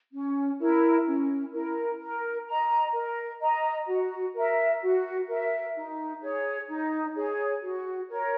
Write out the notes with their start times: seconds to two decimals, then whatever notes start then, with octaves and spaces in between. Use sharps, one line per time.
0.12 C#4
0.59 E4 A#4
1.06 C#4
1.52 E4 A#4
2.00 A#4
2.47 D#5 A#5
2.93 A#4
3.40 D#5 A#5
3.87 F#4
4.34 A#4 E5
4.81 F#4
5.28 A#4 E5
5.74 D#4
6.21 G#4 C#5
6.68 D#4
7.15 G#4 C#5
7.62 F#4
8.09 A#4 C#5